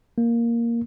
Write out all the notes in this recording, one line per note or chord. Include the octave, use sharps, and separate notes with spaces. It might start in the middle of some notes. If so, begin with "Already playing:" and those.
A#3